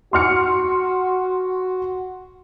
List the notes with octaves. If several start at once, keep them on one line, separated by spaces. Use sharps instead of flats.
F#4 C6 F6 C#7